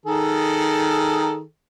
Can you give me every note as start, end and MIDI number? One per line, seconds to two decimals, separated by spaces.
0.06 1.41 51
0.06 1.41 68
0.06 1.41 69